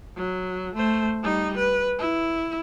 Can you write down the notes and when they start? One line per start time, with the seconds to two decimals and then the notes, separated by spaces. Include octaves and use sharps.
0.16 F#3
0.75 A3 C5
1.22 G3 D#4
1.58 B4
1.99 E4